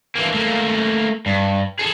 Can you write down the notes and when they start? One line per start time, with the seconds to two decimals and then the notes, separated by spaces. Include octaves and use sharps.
0.15 E3 A#3
0.34 A3 A#3
1.26 G2
1.79 G#4 A4